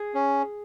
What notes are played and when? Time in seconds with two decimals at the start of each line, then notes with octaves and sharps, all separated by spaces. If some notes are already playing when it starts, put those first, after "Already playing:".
Already playing: G#4
0.14 C#4